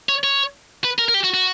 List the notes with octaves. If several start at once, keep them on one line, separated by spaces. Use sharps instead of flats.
C#5
C#5
B4
A#4
A#4
G4
F#4
F#4